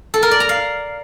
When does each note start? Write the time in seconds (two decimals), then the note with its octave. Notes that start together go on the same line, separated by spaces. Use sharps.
0.14 A4
0.23 A#4
0.31 D5
0.40 A#5
0.49 F5